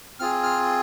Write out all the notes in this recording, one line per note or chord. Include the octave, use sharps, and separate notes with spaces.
C4 F4 G#4 F6
F6